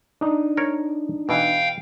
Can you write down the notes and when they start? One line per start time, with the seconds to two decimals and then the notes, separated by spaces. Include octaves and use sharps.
0.21 D4 D#4
0.57 A#4 C#5
1.29 B2 E3 F5 G5